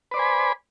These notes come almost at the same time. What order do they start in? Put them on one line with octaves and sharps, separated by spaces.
B4 D5 C5 G#5 B5